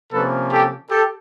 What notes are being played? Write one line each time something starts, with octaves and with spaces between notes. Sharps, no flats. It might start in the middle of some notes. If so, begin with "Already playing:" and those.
C3 F3 A#3 C#4 A4 B4
G4 A4
G4 A4